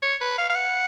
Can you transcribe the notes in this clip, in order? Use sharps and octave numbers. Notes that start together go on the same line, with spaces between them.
C#5
B4
F5
F5
F#5